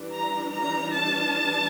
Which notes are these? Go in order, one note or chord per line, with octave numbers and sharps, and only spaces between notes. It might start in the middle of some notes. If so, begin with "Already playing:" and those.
Already playing: E3 G3 D4
A#5
A#5
A5